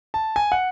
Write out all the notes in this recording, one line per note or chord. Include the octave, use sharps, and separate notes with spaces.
A5
G#5
F#5